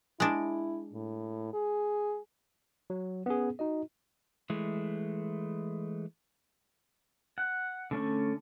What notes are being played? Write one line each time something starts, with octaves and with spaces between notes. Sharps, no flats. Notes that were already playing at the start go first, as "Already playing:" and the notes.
G#3 D4 E4
A2
G#4
F#3
B3 C#4 G#4
D#4 F#4 D#5
E3 G#3 A3
F#5
D3 A3 C#4